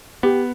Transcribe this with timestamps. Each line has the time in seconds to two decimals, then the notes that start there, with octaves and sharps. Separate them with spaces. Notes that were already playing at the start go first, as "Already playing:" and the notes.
0.23 B3 G4